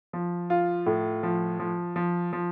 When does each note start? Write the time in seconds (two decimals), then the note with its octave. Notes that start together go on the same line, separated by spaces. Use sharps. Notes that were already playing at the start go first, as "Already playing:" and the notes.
0.13 F3
0.50 F4
0.86 A2
1.23 F3
1.60 F3
1.96 F3
2.33 F3